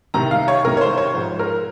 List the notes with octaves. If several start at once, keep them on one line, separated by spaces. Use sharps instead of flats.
C2 C3 D#3 A#5
F5
C#5
C2 C3 D#3 A#4
C#5
C5
C#5
G#2 F3 C5
A#4